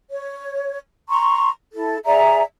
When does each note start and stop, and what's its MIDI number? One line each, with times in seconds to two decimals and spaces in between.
0.10 0.78 73
1.10 1.49 82
1.10 1.49 84
1.10 1.49 85
1.73 1.98 64
1.73 1.98 69
2.05 2.42 68
2.05 2.42 74
2.05 2.42 76
2.05 2.42 82